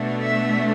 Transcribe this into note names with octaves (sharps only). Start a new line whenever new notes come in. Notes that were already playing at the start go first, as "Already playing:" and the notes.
Already playing: B2 A3 D4
E5